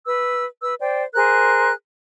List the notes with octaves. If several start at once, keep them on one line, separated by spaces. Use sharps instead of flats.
B4 E6
B4 E6
C5 D5 G5
G#4 A#4 C5 F#6